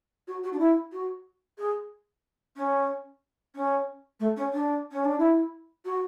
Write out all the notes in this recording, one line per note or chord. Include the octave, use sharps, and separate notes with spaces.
F#4
F#4
D4
E4
F#4
G#4
C#4
C#4
A3
C#4
D4
C#4
D4
E4
F#4